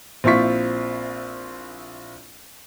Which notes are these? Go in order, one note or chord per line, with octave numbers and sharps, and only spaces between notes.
A#1 C4 E4 F4 C#6 B6